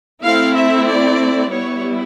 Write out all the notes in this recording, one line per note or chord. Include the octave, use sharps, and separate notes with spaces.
A3 C4 E4 F5
E5
D5
G3 B3 E4 C#5